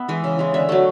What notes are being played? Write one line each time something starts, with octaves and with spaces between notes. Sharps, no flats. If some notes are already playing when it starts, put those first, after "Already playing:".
Already playing: B3 E5
E3 G#3
C#3
E3 G#3
D3 E5
F#3 A3